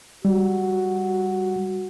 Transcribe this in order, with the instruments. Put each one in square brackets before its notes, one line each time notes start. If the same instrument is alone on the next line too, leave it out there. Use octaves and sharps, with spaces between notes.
[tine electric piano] G3 [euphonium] F#4